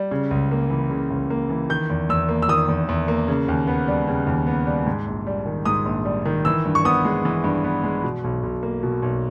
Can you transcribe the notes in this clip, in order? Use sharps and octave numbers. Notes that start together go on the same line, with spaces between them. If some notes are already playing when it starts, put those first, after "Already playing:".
Already playing: G3
C#3
C#2
A#3
E3
C#3
C#2
A#3
E3
D#3 G6
E2
E2 E6
A#3
E6
D#3 D#6
E2
E2
A#3
C#3
D#2
B3
G3
C#3
D#2
B3
G3
G#2
A#1
G3
D#3
G#2 D#6
A#1
G3
D#3
E3 E6
G2
C#6
B3 D#6
G#3
E3
G2
B3
G#3
B2
B1
B1
A#3
B2
B1